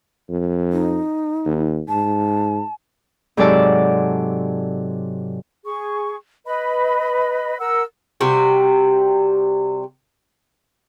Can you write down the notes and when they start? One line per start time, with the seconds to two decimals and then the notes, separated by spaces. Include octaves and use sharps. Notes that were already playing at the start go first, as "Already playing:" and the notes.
0.30 F2
0.72 D#4
1.45 D#2
1.89 G#2 A5
3.37 G#2 C3 F#3 A4 D5 A5
5.64 G#4 C#6
6.46 B4 D#5 B5
7.59 A#4 F#5 E6
8.21 C3 G3 F#4